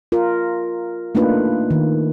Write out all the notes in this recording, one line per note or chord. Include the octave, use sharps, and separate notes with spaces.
F4 A#4
A3 A#3 D4 D#4 F4 B4
D#3